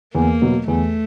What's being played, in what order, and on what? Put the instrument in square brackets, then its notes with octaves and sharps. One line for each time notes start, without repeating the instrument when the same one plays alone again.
[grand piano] E2 [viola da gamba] A#3
[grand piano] B2 F#3
[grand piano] E2 [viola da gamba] A3